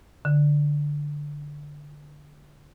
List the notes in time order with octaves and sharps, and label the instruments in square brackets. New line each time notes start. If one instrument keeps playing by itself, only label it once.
[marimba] D3